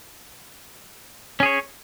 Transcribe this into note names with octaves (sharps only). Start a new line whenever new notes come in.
C#4 G#4 C#5